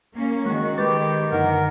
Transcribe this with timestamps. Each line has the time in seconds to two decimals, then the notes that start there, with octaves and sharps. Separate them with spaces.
0.13 A#3 C#4
0.45 D#3 G#3 F#4
0.78 G#3 G4 B4 A6
1.32 F#2 D3 D#4 A#4 F#5